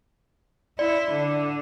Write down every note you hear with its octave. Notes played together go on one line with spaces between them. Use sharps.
E4 D5
D3